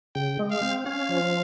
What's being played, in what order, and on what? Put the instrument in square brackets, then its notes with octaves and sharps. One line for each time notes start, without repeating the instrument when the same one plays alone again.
[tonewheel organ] C#3 [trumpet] G5
[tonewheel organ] G#3
[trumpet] F5
[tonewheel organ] C4
[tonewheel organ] C#4 [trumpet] F5
[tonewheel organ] F3